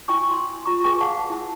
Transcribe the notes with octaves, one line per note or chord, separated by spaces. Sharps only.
E4 G5 G#5 C#6 E6
C6 E6
F4 A#5 C#6
G#4 B4 G5 G#5 C#6
G#4 F5 F#5 A5
E4 A5 E6